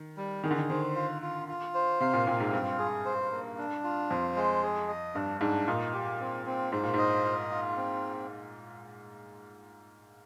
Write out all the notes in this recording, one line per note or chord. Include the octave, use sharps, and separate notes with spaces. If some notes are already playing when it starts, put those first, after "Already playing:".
Already playing: D#3
G3
D#3 G#4
D3
D#3
D#3 C5
F4
F4
F4
C5
C3 F5
A#2
A#2 C4
G#2
G2 F4
G#4
C5
A#3
D4
F4
F2 C5
G#3
G#4
D#5
G2 D4
G#2 D4
A#2 D#4
G4
C4
C4
G#2 C5
A#2
G#2 D#5
F4
F4
C4